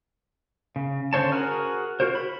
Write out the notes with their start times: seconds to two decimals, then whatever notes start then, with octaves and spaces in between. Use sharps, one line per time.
0.76 C#3
1.13 D3 C#4 C5 C#5 A5
1.32 F#4 G#4 A#4 G#5 F6
2.00 F4 F#4 A#4 C5
2.15 B5